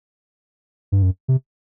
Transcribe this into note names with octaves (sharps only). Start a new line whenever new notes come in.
G2
F#2
C3